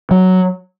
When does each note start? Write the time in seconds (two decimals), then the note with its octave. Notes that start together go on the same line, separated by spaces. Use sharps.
0.11 F#3